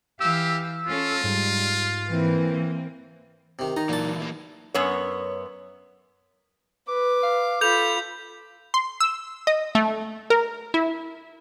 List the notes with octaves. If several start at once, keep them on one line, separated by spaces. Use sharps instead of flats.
E3 G4 F5 E6
C#4 F4 A4
G#2 G3
E3 A#3 C4
C3 D#3
D#3 D#4 A#5
A#2 E3 F#3 A5
E3 A#3
F#2 B3 C#5
B4 D6
F5
F4 A4 B5 G6 F7
C6
E6
D#5
A3
A#4
E4